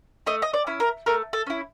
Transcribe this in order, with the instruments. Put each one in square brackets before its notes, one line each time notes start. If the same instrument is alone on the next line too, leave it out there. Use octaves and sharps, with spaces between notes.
[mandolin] A3 D#5
D#5
D5
C#4 E4
A#4
A3 A#4
A4
C#4 E4